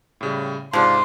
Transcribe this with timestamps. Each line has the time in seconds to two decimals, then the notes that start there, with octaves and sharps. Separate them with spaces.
0.21 A2 C#3 G3
0.73 G#2 C3 F3 D4 C6 F6